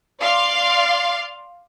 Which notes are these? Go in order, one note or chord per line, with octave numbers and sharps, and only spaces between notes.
D5 F5 C6